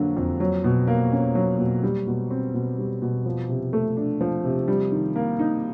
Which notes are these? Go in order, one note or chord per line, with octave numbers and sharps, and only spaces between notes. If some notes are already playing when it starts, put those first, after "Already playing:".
Already playing: F2 D3 F#3 A#3
F2
F#3
B2
A#3
C#4
F#3
B2
G3
B2
C4
B2
G3
B2
F3
C3
A3
D4
F3
C3
G3
D#3
A#3
D#4